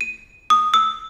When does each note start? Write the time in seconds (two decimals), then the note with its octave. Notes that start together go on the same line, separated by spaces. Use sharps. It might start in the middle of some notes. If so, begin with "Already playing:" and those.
0.01 D#7
0.50 D#6
0.74 E6